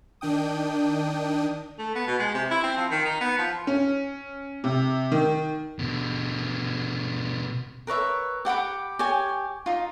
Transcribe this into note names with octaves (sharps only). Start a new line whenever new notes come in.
D#3 D4 G5 D#6
A3
B3
B2
G#3
C3
E4
C4
F3
D#3
D#4
B3
F3
C#4
C3
D#3
B2 D3
A#4 B4 C#5 E5
G4 F#5 B5 D6
G4 C#5 G#5
D#4 F4